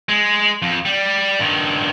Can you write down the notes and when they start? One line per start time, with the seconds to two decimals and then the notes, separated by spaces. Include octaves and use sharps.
0.09 G#3
0.62 F2
0.85 G3
1.39 G2 D#3